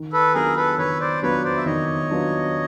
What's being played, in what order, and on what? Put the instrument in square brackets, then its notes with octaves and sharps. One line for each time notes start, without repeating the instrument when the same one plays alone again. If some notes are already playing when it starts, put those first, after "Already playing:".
Already playing: [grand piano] D#3
[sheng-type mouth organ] A4 B4
[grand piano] F#3 B3 D4 F4 [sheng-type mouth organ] G#4 A#4
[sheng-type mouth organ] A4 B4
[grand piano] D#3 [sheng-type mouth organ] B4 C#5
[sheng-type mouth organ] C5 D5
[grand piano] F#3 B3 D4 F4 [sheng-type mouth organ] B4 C#5
[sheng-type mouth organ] C5 D5
E5
[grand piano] D#3 [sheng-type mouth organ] C#5 D#5
[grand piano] F#3 B3 D4 F4